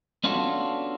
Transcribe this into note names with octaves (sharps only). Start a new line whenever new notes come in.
B3 C#4 D4 F4 F#4 A4